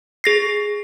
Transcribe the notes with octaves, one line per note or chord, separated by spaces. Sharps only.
G#4 A#6 C7